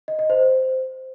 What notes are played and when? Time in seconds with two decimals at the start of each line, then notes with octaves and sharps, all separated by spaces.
0.08 D#5
0.19 D#5
0.30 C5